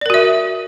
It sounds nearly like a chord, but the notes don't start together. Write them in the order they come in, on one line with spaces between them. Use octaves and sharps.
D5 A#4 F#4 E5